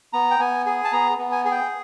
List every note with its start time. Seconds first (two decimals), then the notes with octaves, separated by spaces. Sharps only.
0.13 B3 A#5
0.31 G5
0.40 B3 G#5
0.66 G#4 G#5
0.85 A5
0.92 B3 A#5
1.19 B3
1.32 G#5
1.45 G#4 G#5
1.52 G5